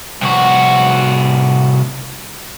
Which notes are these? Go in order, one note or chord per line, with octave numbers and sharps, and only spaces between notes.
C2 F#4